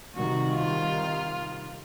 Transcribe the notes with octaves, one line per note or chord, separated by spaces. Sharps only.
C3 D#3 G3 F#4
F4